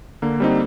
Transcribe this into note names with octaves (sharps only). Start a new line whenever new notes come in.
D3 A#3
G3 C4 D#4